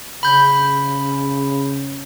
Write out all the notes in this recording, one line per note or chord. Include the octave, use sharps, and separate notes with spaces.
C#3 B5 G6